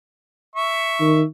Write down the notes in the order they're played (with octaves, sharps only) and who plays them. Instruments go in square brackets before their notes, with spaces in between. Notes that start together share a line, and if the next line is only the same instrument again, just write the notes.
[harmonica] E5 C#6
[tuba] D#3